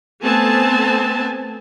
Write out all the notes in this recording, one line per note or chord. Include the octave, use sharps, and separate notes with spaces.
A3 B3 C4 G#5 A5